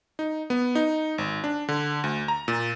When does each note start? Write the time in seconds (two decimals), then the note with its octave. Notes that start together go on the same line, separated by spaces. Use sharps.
0.19 D#4
0.50 B3
0.75 D#4
1.18 G#1
1.44 D4
1.68 D3
2.04 D2
2.28 A#5
2.48 A#2